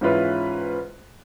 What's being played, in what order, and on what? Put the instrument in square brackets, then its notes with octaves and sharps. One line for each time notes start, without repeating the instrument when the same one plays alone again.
[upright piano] G#2 E3 C#4 E4 F4 B4